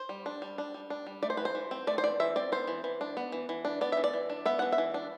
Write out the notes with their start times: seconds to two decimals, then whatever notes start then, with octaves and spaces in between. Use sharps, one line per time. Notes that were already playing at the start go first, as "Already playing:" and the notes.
Already playing: C5
0.09 G3
0.26 D4
0.42 G3
0.58 D4
0.74 G3
0.90 D4
1.07 G3
1.23 A3 D5
1.30 C5
1.37 E3 B4
1.45 C5
1.55 E3
1.71 C4
1.87 A3 D5
1.98 C5
2.03 E3 D5
2.20 E3 E5
2.36 C4 D5
2.52 B3 C5
2.67 E3
2.84 E3
3.01 D4
3.17 B3
3.32 E3
3.49 E3
3.65 D4
3.81 B3 D5
3.92 E3 E5
4.04 D5
4.13 E3
4.30 D4
4.46 B3 E5
4.59 E3 F#5
4.72 E5
4.78 E3
4.94 D4